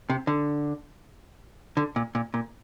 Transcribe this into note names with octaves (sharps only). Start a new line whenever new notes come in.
C3
D3
D3
A#2
A#2
A#2